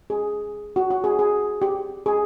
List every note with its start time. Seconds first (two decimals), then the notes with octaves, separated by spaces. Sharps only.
0.10 G#4
0.76 F#4
0.91 F#4
1.04 G#4
1.19 G#4
1.62 G4
2.06 G#4